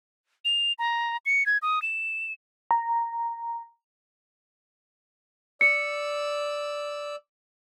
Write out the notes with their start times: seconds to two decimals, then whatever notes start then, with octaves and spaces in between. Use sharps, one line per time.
0.45 F7
0.79 A#5
1.26 C#7
1.46 G#6
1.62 D#6
1.82 E7
2.71 A#5
5.61 D5 E6 C#7